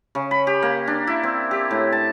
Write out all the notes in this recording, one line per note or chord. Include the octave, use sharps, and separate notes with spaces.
C#3
B5
G4
A#3
D4
E4
C4
G4
A2
A5